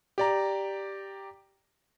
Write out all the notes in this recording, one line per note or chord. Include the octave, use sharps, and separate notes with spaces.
G4 D5 A#5